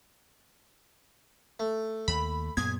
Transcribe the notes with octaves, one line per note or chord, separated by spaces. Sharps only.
A3
D#2 B5
F#2 A#2 B3 G#4 G#6